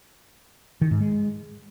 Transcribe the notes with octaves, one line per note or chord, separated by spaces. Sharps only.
D#3
G#2
G#3